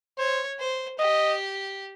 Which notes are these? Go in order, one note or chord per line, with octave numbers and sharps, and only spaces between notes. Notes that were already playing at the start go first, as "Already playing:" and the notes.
C5 C#5
C5
G4 D#5